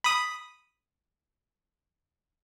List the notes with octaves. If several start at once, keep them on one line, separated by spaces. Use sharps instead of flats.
B5 D#6